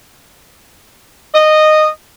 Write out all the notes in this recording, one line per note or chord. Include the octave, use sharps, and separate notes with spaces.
D#5